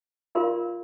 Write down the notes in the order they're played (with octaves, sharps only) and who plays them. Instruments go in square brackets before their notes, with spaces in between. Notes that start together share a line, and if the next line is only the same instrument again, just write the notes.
[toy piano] F4 A#4 D5 F5 C6